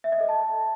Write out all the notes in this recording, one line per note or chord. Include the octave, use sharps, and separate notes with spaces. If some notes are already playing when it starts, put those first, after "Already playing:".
E5
D#5
A4
A5